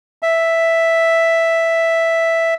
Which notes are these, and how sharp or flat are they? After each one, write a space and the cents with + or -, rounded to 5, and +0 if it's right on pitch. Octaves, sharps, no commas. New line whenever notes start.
E5 +0